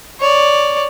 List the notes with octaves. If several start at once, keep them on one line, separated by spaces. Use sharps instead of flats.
C#5 D5